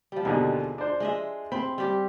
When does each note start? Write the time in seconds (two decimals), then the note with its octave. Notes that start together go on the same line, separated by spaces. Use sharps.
0.12 F3 G3
0.25 D#2 B2 D3 G#3
0.78 D4 C5
1.00 G#3 D#5 E5
1.52 C4 B5
1.78 G3 G4